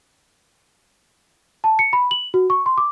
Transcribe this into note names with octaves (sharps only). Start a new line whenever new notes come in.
A5
C#7
B5
F#7
F#4
C#6
C6
D6